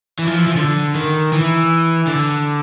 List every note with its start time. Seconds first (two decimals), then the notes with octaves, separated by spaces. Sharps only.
0.19 E3
0.27 F3
0.38 E3
0.47 F3
0.56 D3
0.95 D#3
1.32 E3
2.07 D3